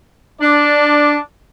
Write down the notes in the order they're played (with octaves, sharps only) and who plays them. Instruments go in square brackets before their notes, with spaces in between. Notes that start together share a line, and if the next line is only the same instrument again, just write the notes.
[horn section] D4 D5